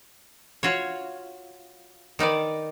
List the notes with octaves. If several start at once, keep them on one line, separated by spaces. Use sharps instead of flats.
F4 F#4 C#5
D#3 D#4 B4 D5